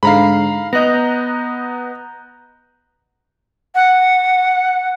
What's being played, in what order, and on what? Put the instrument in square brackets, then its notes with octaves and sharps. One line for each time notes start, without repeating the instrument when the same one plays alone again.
[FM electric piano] G#2 D3 C7 [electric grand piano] F5 A#5 B5
[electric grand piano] B3 D#5 [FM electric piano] A#5 F#6 G6
[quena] F#5